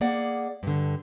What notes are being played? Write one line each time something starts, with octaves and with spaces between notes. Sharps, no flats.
A#3 G#4 D5 F#5
G2 D3